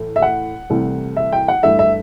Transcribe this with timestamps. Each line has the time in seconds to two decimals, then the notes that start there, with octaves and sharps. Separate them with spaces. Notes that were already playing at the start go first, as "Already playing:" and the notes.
Already playing: A2 E3 A3
0.16 E5
0.22 F#5
0.70 C2 C3 E3 A3
1.16 E5
1.33 G5
1.48 F#5
1.63 G2 E3 A3 E5
1.79 E5